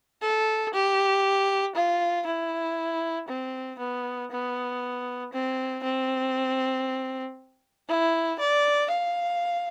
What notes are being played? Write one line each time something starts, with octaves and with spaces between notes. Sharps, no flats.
A4
G4
F4
E4
C4
B3
B3
C4
C4
E4
D5
F5